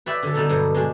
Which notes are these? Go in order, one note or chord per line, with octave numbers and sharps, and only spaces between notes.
B4 C#5 D5 E5 G5
D3 F#3 A4
D3 G3 B3 D4 D#4 A4
G2 B2 F#3
G#3 D4 G4 G#4